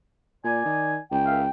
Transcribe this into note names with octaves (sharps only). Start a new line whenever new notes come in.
A#2 D5 G#5
D#3
C#2 G5
A#4 E5 F5